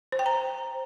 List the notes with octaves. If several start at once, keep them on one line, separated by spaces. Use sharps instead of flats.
C5
G5
A#5